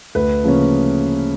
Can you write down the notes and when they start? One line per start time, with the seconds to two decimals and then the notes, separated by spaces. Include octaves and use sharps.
0.15 D2 B4
0.44 C#3 F3 A#3 C#4